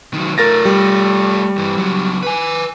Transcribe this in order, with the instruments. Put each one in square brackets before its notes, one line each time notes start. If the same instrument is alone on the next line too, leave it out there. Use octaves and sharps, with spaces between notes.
[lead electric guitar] D#3 F#3
[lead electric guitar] A3 F4 [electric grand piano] A#4 A6 A#6
[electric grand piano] G3
[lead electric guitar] G2 E3
C#2 F#3
B4 G#5